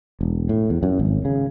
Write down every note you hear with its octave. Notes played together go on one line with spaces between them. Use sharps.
E1
A2
E2
F#2
G#1
C#3